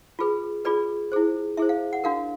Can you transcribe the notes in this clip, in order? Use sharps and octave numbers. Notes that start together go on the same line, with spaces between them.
F4 G#4 B4
F4 G#4 B4 D5
E4 G#4 C5
E4 G#4 C5 E5
F5
F#5
D4 F#4 A#4 F5